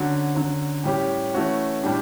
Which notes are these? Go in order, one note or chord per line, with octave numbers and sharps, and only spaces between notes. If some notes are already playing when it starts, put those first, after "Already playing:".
Already playing: D3 F#3 C#4 F#4
D3 F#3 C#4
A2 G3 C#4 G4
E3 A3 C#4 F#4
A2 G3 D4 G4